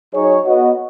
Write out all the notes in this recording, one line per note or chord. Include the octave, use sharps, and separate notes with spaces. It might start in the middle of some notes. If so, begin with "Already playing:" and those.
F#3 D#4 G#4 C#5
B3 F#4 D#5